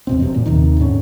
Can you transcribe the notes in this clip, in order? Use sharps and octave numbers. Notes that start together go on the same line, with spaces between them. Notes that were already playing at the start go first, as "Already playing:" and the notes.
E2 B2 C4
E1 F#2 C3
A#2
D#2 C3 D#3
G#2 D3 C#4